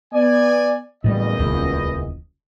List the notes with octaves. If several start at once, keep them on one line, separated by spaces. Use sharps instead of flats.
B3 D5 G#5
F#1 E2 A2 F#3 G3 D#5
D#1 C#2